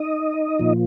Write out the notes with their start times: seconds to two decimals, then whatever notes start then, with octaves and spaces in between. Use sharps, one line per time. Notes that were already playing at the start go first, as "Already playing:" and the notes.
Already playing: D#4 D#5
0.59 A#2 F3